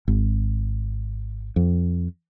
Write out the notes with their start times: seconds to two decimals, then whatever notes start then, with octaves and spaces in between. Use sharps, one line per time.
0.08 G#1
1.56 F2